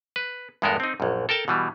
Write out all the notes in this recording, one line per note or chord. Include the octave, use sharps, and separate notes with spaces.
B4
E2 G2 G#3 B3 A4 A#4
C4 D#4
A#1 F#2
A4 A#4 G5 A5
B2 E3 G3